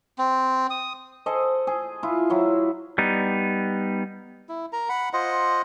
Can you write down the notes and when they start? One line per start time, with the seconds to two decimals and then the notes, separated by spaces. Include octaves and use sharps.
0.18 C4
0.70 D#6
1.26 G#4 A4 C5 D#5
1.67 G#4
2.03 E4 F4
2.30 F#3 E4
2.98 G3 B3 D#4
4.49 E4
4.73 A#4 A#5
4.89 F#5 B5
5.13 F4 C5 D#5 F#5